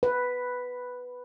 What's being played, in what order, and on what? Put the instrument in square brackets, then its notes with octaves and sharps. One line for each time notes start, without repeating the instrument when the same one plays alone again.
[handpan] B4